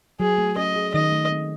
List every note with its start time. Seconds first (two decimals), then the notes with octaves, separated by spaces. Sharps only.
0.20 F#3 G#4
0.38 A3
0.57 C#4 D#5
0.76 G#4
0.94 D#3 D#5
1.12 A3
1.31 C4